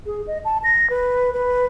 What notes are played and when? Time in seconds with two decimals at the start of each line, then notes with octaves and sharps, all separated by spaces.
0.06 G#4
0.27 D#5
0.45 A5
0.64 A#6
0.90 B4
1.33 B4